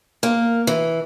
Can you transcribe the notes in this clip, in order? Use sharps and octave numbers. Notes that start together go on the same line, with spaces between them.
A#3
E3